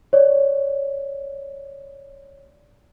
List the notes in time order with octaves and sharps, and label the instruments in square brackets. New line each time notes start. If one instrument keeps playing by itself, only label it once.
[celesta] C#5 D5